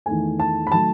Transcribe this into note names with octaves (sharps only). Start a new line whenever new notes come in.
E2 D#3 A3 G#5
A5
B5
D#3 F#3 A3 A5